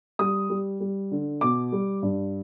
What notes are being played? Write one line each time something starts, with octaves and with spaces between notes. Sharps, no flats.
G3 D#6
G3
G3
D3
B2 D6
G3
G2